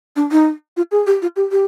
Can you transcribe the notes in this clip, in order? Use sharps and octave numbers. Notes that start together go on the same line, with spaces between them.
D4
D#4
F4
G#4
G4
F4
G4
G4